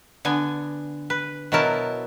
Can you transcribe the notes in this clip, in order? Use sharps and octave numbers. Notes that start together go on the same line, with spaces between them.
D3 B3 G#5
B4
B2 F#3 E4 A#4 A5